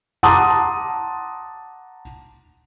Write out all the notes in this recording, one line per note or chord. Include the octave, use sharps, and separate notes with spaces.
F#5 A5 A#5 C6 D6 D#6